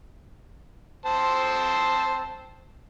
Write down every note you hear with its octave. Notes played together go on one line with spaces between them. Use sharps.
C4 C5 A5